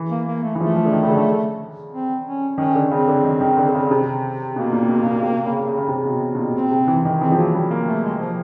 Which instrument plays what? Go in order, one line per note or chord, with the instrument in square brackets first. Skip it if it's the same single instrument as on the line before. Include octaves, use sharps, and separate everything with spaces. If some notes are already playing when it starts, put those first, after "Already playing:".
Already playing: [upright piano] E3
[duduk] A#3
A#3
A3
[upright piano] E3
[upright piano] F3 [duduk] A3
[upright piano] F3
D3
D#3
C#3
D3
[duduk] C4
C#4
[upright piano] D#3 [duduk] C#4
[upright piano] D3
[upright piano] C#3 [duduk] C4
[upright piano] D3
D#3
D#3
D3
D3
C#3
C#3
C3
[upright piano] B2 [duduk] A#3
[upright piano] A#2
B2
B2
C3
C#3
C#3
C#3
C3
B2
B2
A#2
[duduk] C4
[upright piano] C3
E3
D#3
[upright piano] E3 [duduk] C4
[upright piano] F3
[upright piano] F#3 [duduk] A#3
[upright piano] G3
A#3
[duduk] A3
G#3
F3